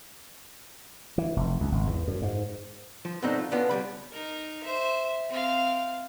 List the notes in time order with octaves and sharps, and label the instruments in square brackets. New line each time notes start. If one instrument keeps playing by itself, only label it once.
[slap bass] E3
F1
C#2
G#1
E2
F#2
G#2
[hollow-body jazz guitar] F3
G2 B2 A3 C4 D4 D#4
F4
B2 D3 B3 C#4 D4 F4
C#2 C3 G3 B5
[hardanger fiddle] D#4 A#4
C5 E5
C4 F5